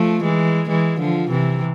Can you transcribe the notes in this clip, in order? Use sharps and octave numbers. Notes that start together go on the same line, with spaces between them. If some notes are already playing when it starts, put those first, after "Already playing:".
Already playing: F3 A3
E3 G#3
E3 G#3
D3 F3
C3 E3